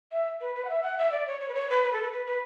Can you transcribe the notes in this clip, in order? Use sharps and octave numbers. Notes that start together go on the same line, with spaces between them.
E5
B4
B4
F#5
E5
F#5
E5
D5
C#5
C#5
B4
C#5
B4
B4
A4
B4
B4
B4